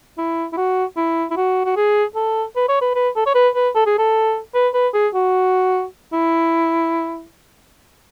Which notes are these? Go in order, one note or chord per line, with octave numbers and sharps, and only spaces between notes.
E4
E4
F#4
E4
E4
F#4
F#4
G#4
A4
B4
C#5
B4
B4
A4
C#5
B4
B4
A4
G#4
A4
B4
B4
G#4
F#4
E4